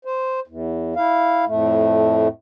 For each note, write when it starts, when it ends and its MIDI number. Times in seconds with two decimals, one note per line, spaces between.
0.05 0.40 72
0.47 0.94 40
0.96 1.45 64
0.96 1.45 77
1.46 2.28 41
1.46 2.28 45
1.46 2.28 57